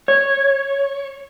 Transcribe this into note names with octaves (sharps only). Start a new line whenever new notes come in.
C#5